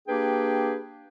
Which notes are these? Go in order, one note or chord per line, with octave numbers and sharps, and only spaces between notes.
A#3 D4 G4 G#4 B4 G5